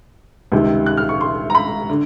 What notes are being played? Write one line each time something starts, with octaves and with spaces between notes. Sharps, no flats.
C#2 C3 D#3
F#6
F6
C#6
C6
A#5
B5
D3